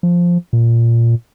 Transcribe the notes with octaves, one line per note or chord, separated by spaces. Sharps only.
F3
A#2